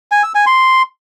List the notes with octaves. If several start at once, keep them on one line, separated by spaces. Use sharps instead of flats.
G#5
E6
G#5
C6